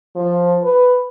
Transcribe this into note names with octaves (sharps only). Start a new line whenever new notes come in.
F3
B4